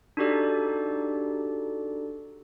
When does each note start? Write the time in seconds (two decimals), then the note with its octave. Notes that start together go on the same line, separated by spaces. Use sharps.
0.17 D4 D#4 F#4 G4 A4 D5